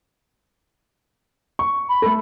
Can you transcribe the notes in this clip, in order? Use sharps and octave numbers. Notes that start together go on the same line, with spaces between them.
C#6
B5
A3 A4